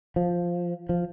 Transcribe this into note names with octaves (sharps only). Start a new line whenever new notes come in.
F3
F3